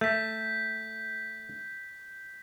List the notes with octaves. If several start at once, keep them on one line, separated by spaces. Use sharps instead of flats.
A3 G6 B6